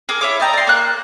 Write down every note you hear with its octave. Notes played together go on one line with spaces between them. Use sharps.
G#4 A#4 D6
E4 C#5 D6
D5 D#5 G5 A#5
D5 C6
A#3 F#6